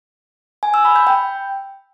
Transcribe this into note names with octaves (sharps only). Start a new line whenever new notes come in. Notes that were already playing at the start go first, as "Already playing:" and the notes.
G#5
E6
B5
G6
G5